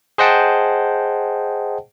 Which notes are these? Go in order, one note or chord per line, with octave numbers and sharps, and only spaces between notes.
G#4 C5 D#5 F#5 G5 A5